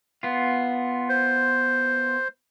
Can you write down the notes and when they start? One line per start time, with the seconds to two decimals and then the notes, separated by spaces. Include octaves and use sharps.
0.23 B3 F4
1.09 C5